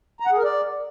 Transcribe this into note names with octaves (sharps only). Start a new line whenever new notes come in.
A#5
F#5
G#4
A#4
D5